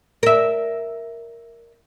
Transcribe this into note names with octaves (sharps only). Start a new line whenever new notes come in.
A#4 E5